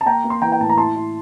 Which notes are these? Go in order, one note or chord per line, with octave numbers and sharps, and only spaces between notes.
A5
A#3 G5 A#5
A#3
C6
E3 G5 A#5
G5
A2 A5
A#5
E4 A5 C6
E4